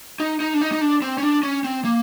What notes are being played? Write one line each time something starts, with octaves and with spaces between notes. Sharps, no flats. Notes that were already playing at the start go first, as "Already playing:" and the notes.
D#4
D#4
D4
D#4
D#4
D4
C4
C#4
D4
C#4
C4
A#3